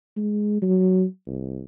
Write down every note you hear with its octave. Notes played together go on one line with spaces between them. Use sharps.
G#3
F#3
C2